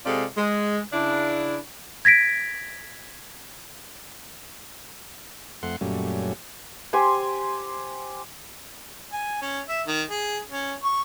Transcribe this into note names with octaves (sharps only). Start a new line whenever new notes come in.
C3 G#3 F4 G#4 A4 D5
G#3
C#3 D4 E4
G#6 A#6 B6 D7
F2 A3 F#5 C6
F#2 A#2 F#3 G3 A3 C#4
G4 C5 G#5 C6
G#5
C#4
E5
D#3
G#4
C#4
C#6